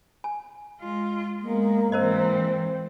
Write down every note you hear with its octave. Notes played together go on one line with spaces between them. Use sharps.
G#5
G#3 F4
G#3 A#3 B3
G#2 E3 C4 A#4 C5 D#5